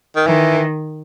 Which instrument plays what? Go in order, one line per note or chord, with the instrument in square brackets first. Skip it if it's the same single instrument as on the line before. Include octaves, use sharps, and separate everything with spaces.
[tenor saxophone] D#3
[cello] D#3 [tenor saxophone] E3